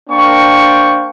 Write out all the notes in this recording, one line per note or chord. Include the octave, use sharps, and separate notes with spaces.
A#3 D4 C5 G5 C#6